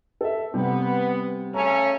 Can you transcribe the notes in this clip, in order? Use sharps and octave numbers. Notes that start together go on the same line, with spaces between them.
A4 E5
C3 G3 B3
C#3 A3 C#4 A#5